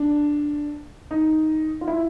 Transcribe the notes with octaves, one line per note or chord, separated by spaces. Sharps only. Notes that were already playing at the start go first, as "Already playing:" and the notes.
Already playing: D4
D#4
F4
E4